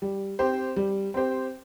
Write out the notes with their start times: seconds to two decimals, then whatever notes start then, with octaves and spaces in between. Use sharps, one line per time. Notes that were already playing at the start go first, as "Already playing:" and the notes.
0.02 G3
0.39 C4 G4 C5
0.76 G3
1.14 C4 G4 C5